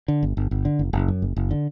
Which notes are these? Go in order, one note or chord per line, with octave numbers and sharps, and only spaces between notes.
D3
G1
G1
G1
D3
F#1
F#1
F#2
F#1
F#1
D3